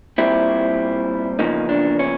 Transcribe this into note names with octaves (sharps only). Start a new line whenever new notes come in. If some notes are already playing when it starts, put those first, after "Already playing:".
A#2 G3 C4 E4
E2 C#3 F3 A#3 D#4
D4
C#4